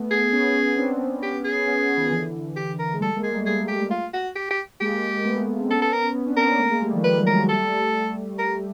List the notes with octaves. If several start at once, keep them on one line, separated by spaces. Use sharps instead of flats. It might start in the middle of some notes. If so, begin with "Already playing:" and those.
Already playing: A3 B3
G#4
B3 C#4
C4 D4
B3 C#4 G4
G#4
B3 C#4
D#3 F3
D3 E3
G4
A#4
G#3
G3 A3 A4
G#3 A#3
G#4
G3 A3
G3 A3 G#4
G4
F4
F#4
G4
G4
G#3 A#3 G4
A3 B3
C4
B3 C#4 A4
A4
A#4
B3 C#4
C4 D4
B3 C#4 A#4
A#3
A3 B3
G#3 A#3
G3 A3
D#3 F3
F3 G3 B4
F#3 G#3
A#4
F#3 G#3
G3 A3 A4
A#4